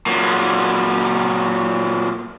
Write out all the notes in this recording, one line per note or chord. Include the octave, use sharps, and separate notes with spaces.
A#2 F#3